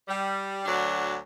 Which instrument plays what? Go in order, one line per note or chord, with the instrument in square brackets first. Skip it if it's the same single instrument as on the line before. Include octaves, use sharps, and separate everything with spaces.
[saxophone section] G3
D2 F#3 D4